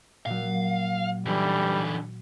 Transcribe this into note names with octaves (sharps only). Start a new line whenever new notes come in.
A#2 F#3 F5
D3 E3 G3